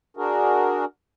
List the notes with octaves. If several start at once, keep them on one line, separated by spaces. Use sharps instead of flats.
D4 F#4 G#4 A#4